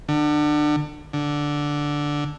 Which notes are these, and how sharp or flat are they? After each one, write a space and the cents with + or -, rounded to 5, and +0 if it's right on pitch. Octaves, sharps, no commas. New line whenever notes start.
D3 +25
D3 -5